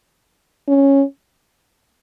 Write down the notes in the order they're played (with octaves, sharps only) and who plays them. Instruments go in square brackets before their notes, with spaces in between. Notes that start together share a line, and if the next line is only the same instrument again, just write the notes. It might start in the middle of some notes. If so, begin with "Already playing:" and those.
[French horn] C#4